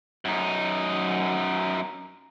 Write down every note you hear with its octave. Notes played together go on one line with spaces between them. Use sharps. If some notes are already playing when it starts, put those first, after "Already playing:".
F#2 D#4